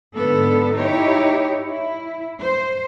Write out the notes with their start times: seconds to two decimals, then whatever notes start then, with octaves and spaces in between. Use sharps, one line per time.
0.18 G#2 D3 B3 A4
0.76 D#4 E4 G4 C#5
1.68 E4
2.41 C5